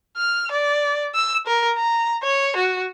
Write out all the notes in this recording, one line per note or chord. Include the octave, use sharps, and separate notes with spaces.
F6
D5
E6
A#4
A#5
C#5
F#4